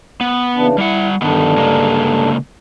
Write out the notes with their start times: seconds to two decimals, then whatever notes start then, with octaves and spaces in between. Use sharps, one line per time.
0.21 B3
0.56 C#3 E3 D4
0.78 G3 E4 F#5
1.22 G2 D3 D#3 B3 D4
1.56 C#3 G#3 A#3